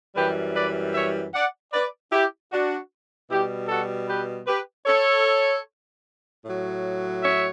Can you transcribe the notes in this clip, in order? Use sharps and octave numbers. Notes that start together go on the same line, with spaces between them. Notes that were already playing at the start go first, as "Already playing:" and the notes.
F#2 E3 G3 G4 B4
B4 D5
C#5 E5
D5 F#5
B4 D5
E4 G4
D4 F#4
B2 G3 E4 G4
F#4 A4
G4 B4
G4 B4
A4 C#5
A2 F#3
C#5 E5